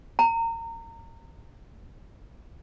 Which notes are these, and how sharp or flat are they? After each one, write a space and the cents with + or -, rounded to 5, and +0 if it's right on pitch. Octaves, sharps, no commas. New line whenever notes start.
A#5 -25